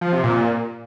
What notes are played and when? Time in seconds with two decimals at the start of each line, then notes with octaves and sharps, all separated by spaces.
0.01 F3
0.12 C3
0.24 A#2